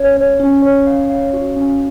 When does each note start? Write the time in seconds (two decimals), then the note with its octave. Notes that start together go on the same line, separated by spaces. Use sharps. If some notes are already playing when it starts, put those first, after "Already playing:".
Already playing: C#4 C#5
0.17 C#5
0.40 C#4
0.62 C#5
0.87 F5
1.10 F5
1.33 F#4
1.56 C#4